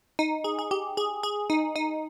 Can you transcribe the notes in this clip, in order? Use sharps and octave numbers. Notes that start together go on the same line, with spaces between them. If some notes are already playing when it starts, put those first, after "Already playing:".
D#4
G#4
G#4
G4
G#4
G#4
D#4
D#4